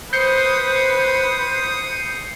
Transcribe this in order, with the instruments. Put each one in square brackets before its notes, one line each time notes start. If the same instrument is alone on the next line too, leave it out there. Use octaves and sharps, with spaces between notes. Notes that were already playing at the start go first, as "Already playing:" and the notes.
[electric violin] B4 [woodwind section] C5 [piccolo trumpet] D#6 [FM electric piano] G6 C7 C#7